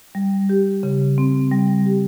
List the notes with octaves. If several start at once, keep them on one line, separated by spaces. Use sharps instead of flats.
G3
G4
C#3
C4
G3
G4